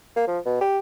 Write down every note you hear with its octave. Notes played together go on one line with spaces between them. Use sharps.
A#3
F3
B2
G4